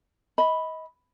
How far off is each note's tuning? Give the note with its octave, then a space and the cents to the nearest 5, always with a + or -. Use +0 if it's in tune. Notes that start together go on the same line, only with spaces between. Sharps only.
D#5 +30 B5 +0